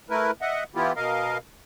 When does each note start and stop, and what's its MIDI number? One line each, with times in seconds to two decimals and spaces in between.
0.10 0.31 57
0.10 0.31 64
0.10 0.31 70
0.10 0.31 71
0.41 0.64 75
0.41 0.64 76
0.41 0.64 78
0.75 0.92 52
0.75 0.92 59
0.75 0.92 64
0.75 0.92 65
0.75 0.92 67
0.96 1.38 47
0.96 1.38 70
0.96 1.38 75
0.96 1.38 77